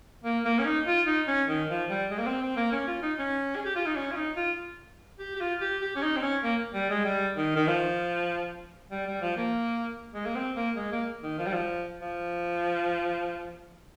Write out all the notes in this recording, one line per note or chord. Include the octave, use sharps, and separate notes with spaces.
A#3
A#3
C#4
D#4
F4
D#4
C#4
D#3
F3
G3
G#3
A#3
C4
C4
A#3
C#4
F4
D#4
C#4
G#4
G4
F4
D#4
C#4
F4
D#4
F4
G4
G4
F4
G4
G4
C#4
D#4
C4
C#4
A#3
G3
G#3
G3
D#3
D#3
F3
G3
G3
F3
A#3
G#3
A#3
C4
A#3
G#3
A#3
D#3
F3
G3
F3
F3